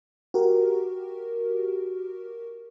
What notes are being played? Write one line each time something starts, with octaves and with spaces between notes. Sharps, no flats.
F#4 G4 A#4